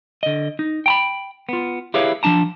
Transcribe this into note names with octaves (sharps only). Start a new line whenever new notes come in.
D3 D#5
D#4
G5 A#5 B5
B3 F4
E4 G4 G#4 B4 C#5 F5
F3 A3 D4 A5 A#5